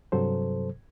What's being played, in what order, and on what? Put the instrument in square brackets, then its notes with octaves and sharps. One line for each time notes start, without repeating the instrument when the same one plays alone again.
[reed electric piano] G2 C3 F#3 A4 C5